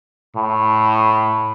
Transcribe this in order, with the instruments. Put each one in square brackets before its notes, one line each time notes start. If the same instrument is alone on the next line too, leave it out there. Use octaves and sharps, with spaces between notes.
[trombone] A2